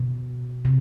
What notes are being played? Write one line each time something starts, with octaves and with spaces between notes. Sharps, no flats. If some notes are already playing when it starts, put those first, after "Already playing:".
Already playing: B2
C3